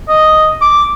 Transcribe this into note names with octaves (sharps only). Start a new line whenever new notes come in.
D#5
D6